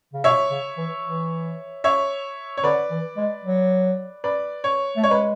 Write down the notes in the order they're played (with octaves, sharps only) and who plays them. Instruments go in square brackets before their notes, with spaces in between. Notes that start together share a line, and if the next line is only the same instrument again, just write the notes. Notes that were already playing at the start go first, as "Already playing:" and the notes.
[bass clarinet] C#3
[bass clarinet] B2 [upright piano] C#5 E5
[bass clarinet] C#3
E3
E3
[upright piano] C#5 E5
C#5
[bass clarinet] D3 [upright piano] B4 D5
[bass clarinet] E3
G#3
F#3
[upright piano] B4 D5
C#5
[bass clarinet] A3
[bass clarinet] G#3 [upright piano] C#5
[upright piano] B4